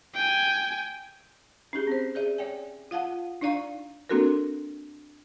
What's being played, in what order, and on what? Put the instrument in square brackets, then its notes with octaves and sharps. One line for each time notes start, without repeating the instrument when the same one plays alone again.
[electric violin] G5 G#5
[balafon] C#4 D#4 G4 G#4
C4 C5
G#4 D5 E5
C#5 D5 G5 G#5
F4 F5 F#5 A5
D4 D#4 D5 F5 A#5 C#6
[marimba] A#3 C4 D4 F#4 A4 A#4